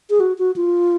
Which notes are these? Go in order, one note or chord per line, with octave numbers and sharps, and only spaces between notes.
G#4
F#4
F#4
F4